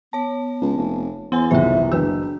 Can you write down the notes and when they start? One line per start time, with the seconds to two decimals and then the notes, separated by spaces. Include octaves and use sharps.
0.13 B3 C#5 A5
0.62 C#2
0.77 F1
1.32 E2 B3 F#5 G#5
1.51 F#1 C2 D#3 F4 C5 E5
1.92 F#1 D4 F#4 B4 E6